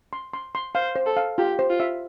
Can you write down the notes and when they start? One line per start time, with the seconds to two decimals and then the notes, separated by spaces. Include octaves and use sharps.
0.13 C6
0.34 C6
0.55 C6
0.75 C5 F5
0.96 C5
1.06 A4
1.17 F5
1.38 F4 G4
1.59 C5
1.70 F4
1.80 E5